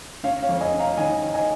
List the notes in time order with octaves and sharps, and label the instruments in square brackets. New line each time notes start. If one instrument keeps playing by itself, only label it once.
[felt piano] C#4 C#5 F5
C#5 F5
F2
D#5 G#5
C#4
F5 A#5
D#3 D#5 G#5
D#3
D#5 G#5